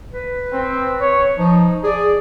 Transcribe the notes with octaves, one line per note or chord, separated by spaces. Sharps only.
B4
C4
C#5
F3 D#4
G#4 D5